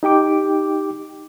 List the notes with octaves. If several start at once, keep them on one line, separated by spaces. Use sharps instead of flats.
D#4 G4 G5 D6